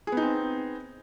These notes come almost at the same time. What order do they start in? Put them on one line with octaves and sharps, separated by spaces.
G#4 B3 D#4 C4